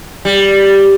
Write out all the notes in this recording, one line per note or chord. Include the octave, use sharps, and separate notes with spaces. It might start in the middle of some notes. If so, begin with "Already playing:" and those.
G3